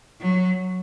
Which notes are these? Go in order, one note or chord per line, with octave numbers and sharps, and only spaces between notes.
F#3